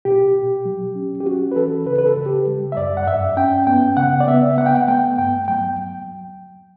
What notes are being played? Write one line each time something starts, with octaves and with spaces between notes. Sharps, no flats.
B2 G4
B2
F#3
C#4
G4
C#4 F#4
B4
E3 A4
C#3 B4
B4
A4
C#3
G4
G3
E5
F#2 D5
F#5
G2 E5
C#4 G5
B3 G5
C#3 F#5
D5
B3 E5
B3 F#5
G5
F#5
A3 G5
G2 G5
F#3 G5